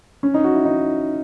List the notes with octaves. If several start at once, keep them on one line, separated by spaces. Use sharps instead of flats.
C#4
D#4
F#4
E4
D#4